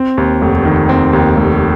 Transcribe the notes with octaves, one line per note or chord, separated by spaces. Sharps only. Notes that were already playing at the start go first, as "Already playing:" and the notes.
Already playing: C4
D#2
F1
D#3
C4
D#2
F1